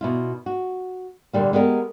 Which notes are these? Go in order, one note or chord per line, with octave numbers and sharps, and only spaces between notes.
B2 E4 F4
F#4
A#2 D3 G3 A#3
G#3 B3 G4 A#4